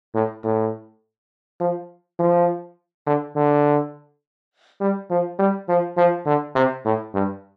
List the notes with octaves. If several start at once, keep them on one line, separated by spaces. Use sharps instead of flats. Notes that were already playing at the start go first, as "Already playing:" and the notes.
A2
A2
F3
F3
D3
D3
G3
F3
G3
F3
F3
D3
C3
A2
G2